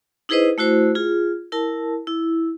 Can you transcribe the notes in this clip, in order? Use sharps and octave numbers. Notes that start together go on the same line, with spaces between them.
D#4 E4 G#4 B4 C5 D#5
A3 E4 F#4 C5
F4 G#4
E4 A#4 A5
E4